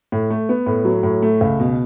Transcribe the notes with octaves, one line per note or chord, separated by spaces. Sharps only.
A2
A3
B3
A2
F#3
A2
A3
C#2
B2